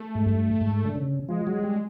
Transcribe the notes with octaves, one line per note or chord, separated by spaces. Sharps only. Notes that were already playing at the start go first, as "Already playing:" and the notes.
Already playing: A3
G#2
G2
G#2
D3
C#3
F3 G#3
F#3
G3